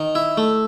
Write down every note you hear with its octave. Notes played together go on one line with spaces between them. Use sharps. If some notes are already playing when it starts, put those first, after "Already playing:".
Already playing: D#3
E4
A3